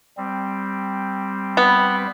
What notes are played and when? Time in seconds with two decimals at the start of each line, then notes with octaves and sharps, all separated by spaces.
0.17 G3 C4
1.57 B3